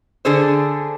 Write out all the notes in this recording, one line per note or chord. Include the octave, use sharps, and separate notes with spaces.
D3 D4 G#4 A4 C5